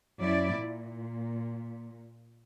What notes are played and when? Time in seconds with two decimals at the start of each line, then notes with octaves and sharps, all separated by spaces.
0.21 F#2 E4 D5
0.56 A#2